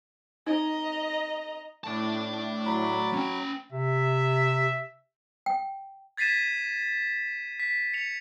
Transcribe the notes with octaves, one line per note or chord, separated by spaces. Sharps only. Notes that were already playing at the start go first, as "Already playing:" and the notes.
D#4 D#5 A#5
A2 D5 A5
F#3 B5
C#4 G5
C3 E5
G5
G#6 A6 B6 C7 D#7 E7
B6
C#7 F7